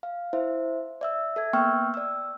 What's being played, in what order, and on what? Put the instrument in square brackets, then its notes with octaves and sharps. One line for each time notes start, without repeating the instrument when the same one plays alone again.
[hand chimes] F5
E4 C5 E5
D5 E5 E6
A4 E5 G#6
A#3 B3 G5 C#6 E6 F6
D5 E6